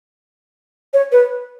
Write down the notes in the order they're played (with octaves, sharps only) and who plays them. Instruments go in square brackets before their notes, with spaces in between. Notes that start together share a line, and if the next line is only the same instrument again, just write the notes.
[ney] C#5
B4